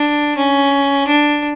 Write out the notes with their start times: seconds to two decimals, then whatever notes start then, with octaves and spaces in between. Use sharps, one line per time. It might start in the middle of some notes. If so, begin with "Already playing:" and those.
Already playing: D4
0.37 C#4
1.07 D4